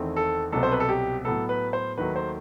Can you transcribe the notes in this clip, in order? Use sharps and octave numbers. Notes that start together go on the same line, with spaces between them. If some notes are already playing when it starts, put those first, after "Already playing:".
Already playing: E2 D#3 A3 C4
A4
C2 B2 F#3 C4 A4
C5
B4
A4
G4
A2 F#3 B3 A4
B4
C5
D#2 D#3 F#3 A3 B4
C5